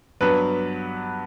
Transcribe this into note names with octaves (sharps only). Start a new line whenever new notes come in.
G2 F#3 B3 B4